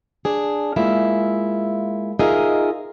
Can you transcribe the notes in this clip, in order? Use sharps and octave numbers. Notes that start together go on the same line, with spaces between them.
D4 G#4
G#3 A#3 E4 F4 E5
D#4 F4 G#4 A#4 D#5 E5